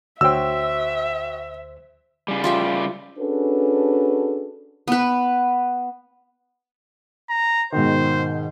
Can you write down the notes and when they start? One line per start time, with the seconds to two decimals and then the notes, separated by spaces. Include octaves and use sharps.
0.21 D2 F#4 C5 C#5 E5 G5 E6
2.28 C#3 G3
2.44 F4 G4 E5
3.19 C#4 D4 F#4 G#4 A4 B4
4.88 B3 B4
7.29 A#5
7.72 G#2 B2 D#3 C5